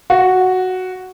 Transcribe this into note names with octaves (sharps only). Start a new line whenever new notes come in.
F#4